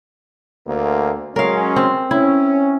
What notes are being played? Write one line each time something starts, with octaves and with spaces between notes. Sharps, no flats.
D2 A#3
F#3 G#3 C#4 A#4 F5
C4
C#4 E4